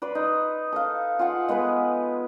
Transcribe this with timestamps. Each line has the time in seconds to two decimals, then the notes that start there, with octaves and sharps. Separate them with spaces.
0.02 B4 D5 B5 C6
0.15 D#4
0.72 A4 D#5 F5
1.19 F4 G#4 F#5
1.48 G#3 B3 A4 B4